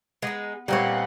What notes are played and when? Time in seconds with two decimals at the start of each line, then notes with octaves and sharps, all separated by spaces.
0.22 G#3 B3 D#4
0.68 A#2 G3 C4 B4 C#5 D#5 F#5